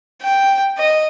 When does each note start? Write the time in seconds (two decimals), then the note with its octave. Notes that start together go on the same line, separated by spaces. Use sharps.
0.22 G5
0.78 D#5